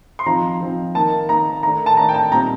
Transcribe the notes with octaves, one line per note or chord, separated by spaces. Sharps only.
C6
F3 C4 D#4 A#5
F3 C4 D#4
D#3 A#3 D#4 A5
D#3 A#3 D#4 A#5
D#3 A3 D4 A#5
A5
D#3 A3 D4 A#5
G5
A5
A#2 G3 C4 D#4 A#5